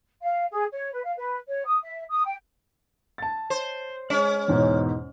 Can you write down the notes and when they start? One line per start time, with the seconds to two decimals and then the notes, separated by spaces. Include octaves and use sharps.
0.22 F5
0.51 G#4
0.72 C#5
0.92 B4
1.04 F5
1.17 B4
1.48 C#5
1.66 D#6
1.82 E5
2.09 D#6
2.25 G5
3.18 A5 A6
3.50 C5
4.10 G#3 C#4
4.48 E2 G#2 B2